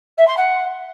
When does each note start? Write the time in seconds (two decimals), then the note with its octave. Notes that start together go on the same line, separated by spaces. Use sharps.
0.17 E5
0.27 C6
0.37 F#5